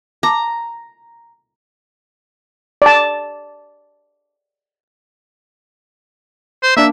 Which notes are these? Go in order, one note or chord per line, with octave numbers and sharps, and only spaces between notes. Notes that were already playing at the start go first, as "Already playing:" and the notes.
A5 A#5 D6
D5 A5
C5
A#3 D4 E5